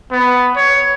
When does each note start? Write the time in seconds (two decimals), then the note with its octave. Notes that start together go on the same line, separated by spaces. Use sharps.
0.11 B3
0.56 C#5